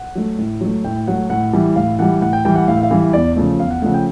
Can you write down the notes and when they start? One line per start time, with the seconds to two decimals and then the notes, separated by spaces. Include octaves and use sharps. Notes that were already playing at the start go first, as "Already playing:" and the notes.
Already playing: F#5
0.15 F#3 A3
0.39 A2
0.61 F#3 A3
0.84 A2 G5
1.07 F#3 A3 F#5
1.30 A2 F#5
1.53 E3 G3
1.76 A2 F5
1.99 E3 G3 F#5
2.22 A2 F#5
2.33 G5
2.45 E3 G3 G5
2.56 F#5
2.68 A2 F5
2.77 E5
2.83 F5
2.91 E3 G3
2.99 E5
3.13 E2 D5
3.36 C#3 F3 A3
3.60 E2 F5
3.71 F#5
3.82 C#3 F3 A3 F#5
3.94 G5